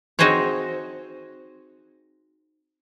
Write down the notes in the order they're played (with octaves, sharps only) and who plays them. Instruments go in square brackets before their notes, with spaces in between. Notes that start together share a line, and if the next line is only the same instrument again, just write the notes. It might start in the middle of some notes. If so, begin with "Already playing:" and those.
[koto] C4 D#4 F#4 G#4 C5 C#5